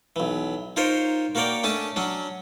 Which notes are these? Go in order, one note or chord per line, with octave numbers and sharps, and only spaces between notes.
B1 E3
D#4 F4 A#4 C5 C#5
A#3 F#4 A#4 C#5 D5 G5
A3 C#4 D4 G#5 A5
F#3 C#4 D4